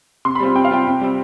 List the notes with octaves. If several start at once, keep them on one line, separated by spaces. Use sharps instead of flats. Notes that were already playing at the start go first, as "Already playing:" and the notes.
C3 C6
B5
G3 C4 F4
C3 G5
F5
G3 C4 F4 G5
C3
G3 C4